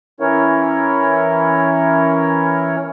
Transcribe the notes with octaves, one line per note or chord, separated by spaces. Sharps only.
E3 C#4 E4 A#4 C#5